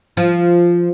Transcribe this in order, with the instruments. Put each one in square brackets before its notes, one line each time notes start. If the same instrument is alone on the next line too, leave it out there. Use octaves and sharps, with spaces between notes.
[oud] F3